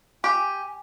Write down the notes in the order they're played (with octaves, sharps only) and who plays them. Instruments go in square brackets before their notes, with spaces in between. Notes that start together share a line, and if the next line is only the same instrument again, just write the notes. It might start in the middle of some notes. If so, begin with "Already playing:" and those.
[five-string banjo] G4 [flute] G#5